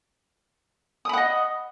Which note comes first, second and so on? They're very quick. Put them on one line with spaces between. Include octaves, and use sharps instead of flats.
D#6 B5 F#5 D#5